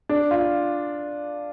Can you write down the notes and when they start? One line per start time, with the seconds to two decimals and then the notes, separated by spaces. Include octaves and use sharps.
0.09 D4
0.31 F4